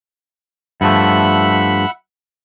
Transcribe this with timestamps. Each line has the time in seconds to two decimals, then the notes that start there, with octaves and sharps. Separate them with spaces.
0.81 G2 F3 A3 E5 F#5 B5